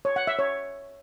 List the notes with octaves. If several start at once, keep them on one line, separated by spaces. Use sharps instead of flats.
C#5
F#5
E5
C#5